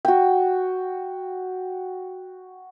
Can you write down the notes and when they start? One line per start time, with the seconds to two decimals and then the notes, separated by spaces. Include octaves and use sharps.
0.05 F#4 G5